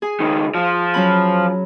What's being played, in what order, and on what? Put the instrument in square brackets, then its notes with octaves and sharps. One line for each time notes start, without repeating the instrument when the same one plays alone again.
[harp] G#4 G#5
[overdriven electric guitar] C#2 D#3
F3
[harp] F#3 C#4 B5